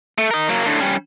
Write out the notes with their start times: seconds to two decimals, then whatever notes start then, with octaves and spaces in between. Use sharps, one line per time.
0.18 A3
0.31 A#4 D#5
0.49 F#3 A#3
0.65 A2 D3
0.80 G3 C#4